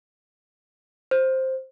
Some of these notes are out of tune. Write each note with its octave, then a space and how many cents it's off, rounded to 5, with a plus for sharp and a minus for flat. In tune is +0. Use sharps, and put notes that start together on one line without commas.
C5 +5